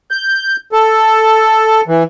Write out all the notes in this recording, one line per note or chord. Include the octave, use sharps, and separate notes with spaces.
G6
A4
E3